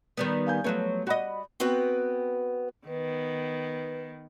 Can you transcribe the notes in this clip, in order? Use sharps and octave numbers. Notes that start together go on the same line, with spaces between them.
D#3 G3 B3
F5 G#5 G6
F3 F#3 A3 B3 C#5
F#4 D5 D#5 F#5 B5
B3 C4 F#4 B4 G5
D#3 B3 B4